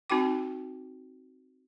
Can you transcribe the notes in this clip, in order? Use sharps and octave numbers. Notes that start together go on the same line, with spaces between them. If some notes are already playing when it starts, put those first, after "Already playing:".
C4 D#4 F#4 G5 D6